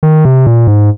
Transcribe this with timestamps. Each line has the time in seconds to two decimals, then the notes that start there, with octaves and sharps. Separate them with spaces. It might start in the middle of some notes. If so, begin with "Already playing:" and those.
0.03 D#3
0.25 C3
0.47 A#2
0.67 G#2